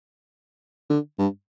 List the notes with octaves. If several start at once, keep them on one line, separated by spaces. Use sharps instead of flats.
D3
G2